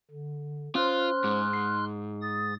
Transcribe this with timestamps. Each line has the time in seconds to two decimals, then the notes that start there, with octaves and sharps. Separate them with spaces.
0.11 D3
0.75 C#4 F4 C5 C6 F6 F#6
1.24 G#2
1.53 C7
2.22 D#6 A6